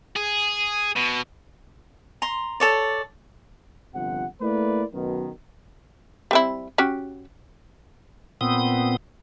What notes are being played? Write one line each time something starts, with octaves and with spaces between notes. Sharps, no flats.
G#4
B2
A#5 C6
A4 C#5 D5
G1 C3 F3 F#5
A3 A#3 E4 A#4 B4 D5
F#2 B2 D#3
G3 C4 E4
C#4 F#4 G4
A#2 B3 C4 D#6